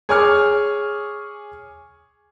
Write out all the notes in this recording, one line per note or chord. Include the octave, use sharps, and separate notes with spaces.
G#4 C#5 G#5 C#6 D6 F6